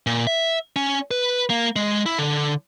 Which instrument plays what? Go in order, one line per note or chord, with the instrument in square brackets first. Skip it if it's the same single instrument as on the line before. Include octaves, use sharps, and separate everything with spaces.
[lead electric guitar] A#2
E5
C#4
B4
A#3
G#3
E4
D3